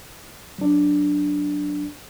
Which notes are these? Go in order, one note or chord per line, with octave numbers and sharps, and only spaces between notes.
F#3 D4